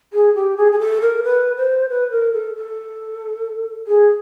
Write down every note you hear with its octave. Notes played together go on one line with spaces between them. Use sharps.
G#4
G4
G#4
G#4
A4
A#4
B4
C5
B4
A#4
A4
A4
G#4